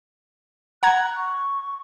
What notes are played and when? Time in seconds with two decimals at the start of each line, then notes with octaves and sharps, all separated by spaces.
0.83 F#5 A#5 F#6 G#6
1.16 C#6